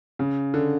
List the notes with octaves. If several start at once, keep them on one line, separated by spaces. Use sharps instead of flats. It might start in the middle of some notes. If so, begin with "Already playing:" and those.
C#3
D3